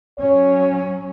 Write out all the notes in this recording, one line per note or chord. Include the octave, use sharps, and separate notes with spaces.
F#3 C#4 C#5